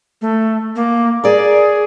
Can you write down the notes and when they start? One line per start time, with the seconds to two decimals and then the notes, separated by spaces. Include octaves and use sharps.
0.22 A3
0.76 A#3
1.24 G#4 A#4 D5